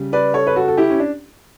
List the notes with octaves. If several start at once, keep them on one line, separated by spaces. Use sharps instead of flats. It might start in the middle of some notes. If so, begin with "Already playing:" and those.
Already playing: C#3 G3
B4 D5
A4 C#5
B4
F#4 A4
A4
E4 G4
C#4
D4